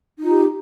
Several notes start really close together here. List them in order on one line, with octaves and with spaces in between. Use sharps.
D#4 F4 G4